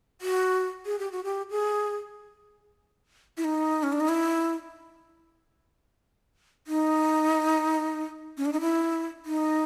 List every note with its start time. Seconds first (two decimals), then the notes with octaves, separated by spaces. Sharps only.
0.21 F#4
0.86 G#4
0.99 G4
1.12 F#4
1.24 G4
1.51 G#4
3.37 E4
3.44 D#4
3.83 C#4
3.92 D4
4.00 D#4
4.09 E4
6.67 D#4
8.38 C#4
8.45 D4
8.53 D#4
8.61 E4
9.26 D#4